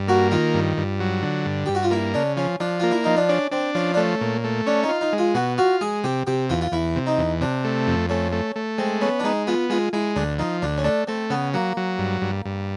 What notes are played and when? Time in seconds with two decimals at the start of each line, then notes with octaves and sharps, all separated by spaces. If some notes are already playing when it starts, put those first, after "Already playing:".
Already playing: G2
0.08 A#3 F#4
0.31 D#3 F4
0.54 G2
0.77 G2
1.00 F#3
1.23 D3
1.46 G2
1.66 G2 G4
1.75 F#4
1.83 F4
1.91 A#3 E4
2.14 C#3 D4
2.37 F3 C#4
2.60 F3 D4
2.80 A#3 F4
2.91 E4
3.04 F3 D#4
3.17 D4
3.29 C#4 D4
3.51 C4 D4
3.75 F3 C#4
3.94 D4
3.97 A3 C#4
4.21 A#2
4.44 A3
4.66 C#4 D4
4.83 D#4
4.89 F4
5.01 D#4
5.13 G#3
5.18 F4
5.34 B2 F#4
5.58 F4 F#4
5.81 G#3 G#4
6.04 C3 G4
6.27 C3 G4
6.50 E2 F4
6.61 F4
6.72 E2 E4
6.96 C3
7.06 D#4
7.18 E2
7.41 C3 D4
7.64 A3
7.87 F2
8.09 A3 C#4
8.32 A3
8.56 A3
8.78 G#3 C4
9.01 B3 C#4
9.20 D4
9.24 G#3 D#4
9.47 B3 F4
9.70 G#3 F4
9.93 G#3 E4
10.16 D2 D4
10.39 F3 D#4
10.62 D2 D4
10.78 C#4
10.84 A3 D4
11.07 A3 C4
11.30 C#3 B3
11.54 F#3 A#3
11.77 F#3
11.99 G2
12.22 G2
12.45 G2